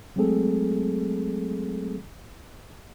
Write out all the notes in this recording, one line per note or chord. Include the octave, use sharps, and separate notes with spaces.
F#3 G#3 A3 C4 G#4 A4